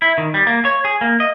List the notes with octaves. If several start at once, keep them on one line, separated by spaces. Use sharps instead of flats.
E4
D#3
G3
A#3
C#5
G#4
A#3
D#5